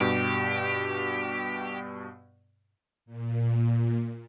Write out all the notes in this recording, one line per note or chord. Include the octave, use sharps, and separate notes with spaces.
G2 B2 G4
A#2